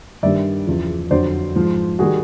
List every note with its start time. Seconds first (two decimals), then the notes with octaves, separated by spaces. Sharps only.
0.23 G2 D#3 G3 D5 E5
0.67 E2 C#3 F3
1.11 F2 D3 F#3 C5 D5
1.55 G#2 F3
1.99 D#3 G3 F#4 G#4